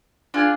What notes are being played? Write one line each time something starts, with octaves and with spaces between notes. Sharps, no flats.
D4 F4 G#4